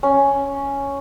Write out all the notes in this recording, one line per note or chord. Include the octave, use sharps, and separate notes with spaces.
C#4